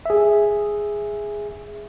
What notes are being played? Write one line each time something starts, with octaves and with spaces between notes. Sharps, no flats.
G#4 E5